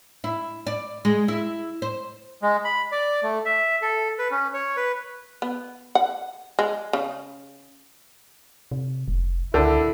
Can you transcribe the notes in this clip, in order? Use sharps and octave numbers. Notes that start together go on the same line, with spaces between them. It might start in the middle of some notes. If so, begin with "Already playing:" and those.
E4
D5
G#3
E4
C5
G#3
B5
D5
A3
E5
A4
B4
C#4
C#5
B4
B3
F#5
G#3
C#3
C3
F1
C#2 D3 E4